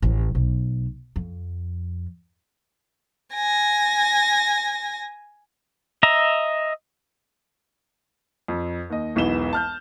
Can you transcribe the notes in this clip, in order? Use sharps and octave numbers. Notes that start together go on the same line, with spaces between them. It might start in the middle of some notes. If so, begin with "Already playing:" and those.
A1
B1
F2
G#5 A#6
D#5 E5 A#5
F2
D#2 D#5
E1 B1 E3 B3 E7 G7
A5 F6 G6